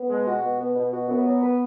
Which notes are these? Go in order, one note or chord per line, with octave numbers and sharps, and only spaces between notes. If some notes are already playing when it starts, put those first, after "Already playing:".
Already playing: B3
B2 G#3
F#4
B2
B3
B2
F#4
F#2 B3
F#3
B4